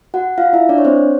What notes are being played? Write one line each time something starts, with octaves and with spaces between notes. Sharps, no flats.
F#4 F#5
F4 F5
E4 E5
D4 D5
C#5
C4 C5